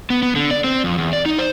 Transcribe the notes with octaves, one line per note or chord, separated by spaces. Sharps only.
B3
B3
D3
D5
C4
F2
E2
D5
D#4
C5